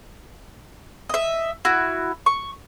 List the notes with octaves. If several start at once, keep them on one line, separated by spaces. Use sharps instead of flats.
D#5 E5
E4 F#4
C#6